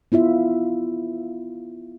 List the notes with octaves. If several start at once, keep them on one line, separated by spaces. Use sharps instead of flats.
B3 E4 F4 E5